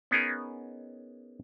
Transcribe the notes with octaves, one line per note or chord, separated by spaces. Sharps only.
B3 C#4 D#4 G#4 A#4